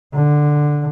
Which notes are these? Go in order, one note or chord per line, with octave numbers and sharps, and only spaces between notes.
D3